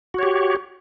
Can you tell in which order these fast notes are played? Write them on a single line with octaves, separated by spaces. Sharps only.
F#4 C#5 G4